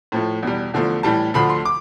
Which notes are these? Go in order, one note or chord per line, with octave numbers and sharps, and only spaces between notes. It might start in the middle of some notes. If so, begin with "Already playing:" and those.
A2 F3 A3
E2 B2 G3
E2 D3 F3 A3
A2 E3 G3 A5
D2 D3 F3 A3 B5
C6
D6